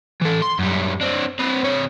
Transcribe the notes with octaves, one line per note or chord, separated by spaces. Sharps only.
E3 A4
C6
F#2 G3
C4 D4
C4 B4
C3 C#5